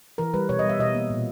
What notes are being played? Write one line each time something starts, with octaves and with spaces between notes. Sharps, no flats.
E3 A#4
G3 B4
B2 C#5
D#5
G3 E5
B2 D#5
A#3
A#2